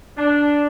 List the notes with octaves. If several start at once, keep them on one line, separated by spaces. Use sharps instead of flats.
D4